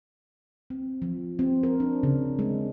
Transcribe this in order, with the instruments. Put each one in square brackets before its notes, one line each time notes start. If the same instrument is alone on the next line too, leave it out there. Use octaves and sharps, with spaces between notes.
[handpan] C4
F3
C4
A#4
D4
C#3
G#3